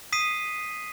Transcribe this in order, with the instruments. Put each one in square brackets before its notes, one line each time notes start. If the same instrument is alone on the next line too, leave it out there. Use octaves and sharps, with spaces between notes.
[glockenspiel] D#6 B6 C7 D#7